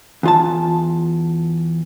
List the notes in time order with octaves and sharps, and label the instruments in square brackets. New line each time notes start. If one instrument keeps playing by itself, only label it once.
[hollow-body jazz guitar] E2 F4 A5